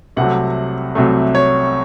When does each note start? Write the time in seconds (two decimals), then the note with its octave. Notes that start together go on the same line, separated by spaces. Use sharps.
0.16 C2 C3 F#3 A3 F#5
0.95 C2 C3 F#3 A3
1.35 C#5